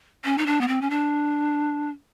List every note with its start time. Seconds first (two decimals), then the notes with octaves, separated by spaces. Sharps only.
0.25 C#4
0.38 D#4
0.47 D4
0.61 B3
0.68 C4
0.82 C#4
0.90 D4